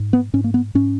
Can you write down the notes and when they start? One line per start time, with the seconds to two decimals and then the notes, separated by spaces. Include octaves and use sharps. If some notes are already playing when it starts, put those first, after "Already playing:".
Already playing: G#2
0.13 B3
0.33 G#2 C#4
0.44 A#3
0.54 B3
0.75 G#2 C#4